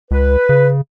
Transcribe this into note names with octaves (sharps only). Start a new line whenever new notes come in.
C#2 B4
C#3